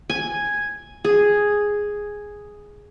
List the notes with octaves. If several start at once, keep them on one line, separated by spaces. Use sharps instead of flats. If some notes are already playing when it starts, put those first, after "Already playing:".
G#5
G#4